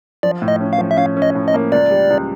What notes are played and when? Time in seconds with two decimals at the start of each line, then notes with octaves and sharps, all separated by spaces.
0.23 F3 D5
0.42 A2
0.48 D#5
0.61 C#4
0.73 F5
0.78 F3
0.91 E5
0.97 C#4 F5
1.17 C#4
1.22 D#5
1.35 A2
1.48 D#5
1.54 A#3
1.72 C#2 D5
1.91 G3
2.10 C#2